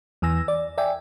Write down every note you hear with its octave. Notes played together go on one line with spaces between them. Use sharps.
E2 E3 G#5 E6 A#6
D5
D5 E5 G5 G#5